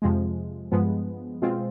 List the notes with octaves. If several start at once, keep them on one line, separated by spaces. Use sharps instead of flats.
F2 C3 F3 G#3
G2 F3 G#3 B3
B2 G#3 C4 F4